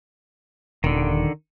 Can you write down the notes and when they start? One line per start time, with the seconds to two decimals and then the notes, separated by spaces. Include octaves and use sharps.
0.84 D#1 D3 D#3